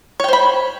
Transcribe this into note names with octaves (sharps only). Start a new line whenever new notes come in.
C5 C#5 G5 B5